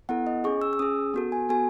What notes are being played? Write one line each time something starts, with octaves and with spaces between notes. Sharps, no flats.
B3 E4 A4 F#5
D#5
C#4 G#4 C#6
E6
E6
C#4 G#4 D#6
B3 F#4 A4
G#5
B3 F#4 A4 G#5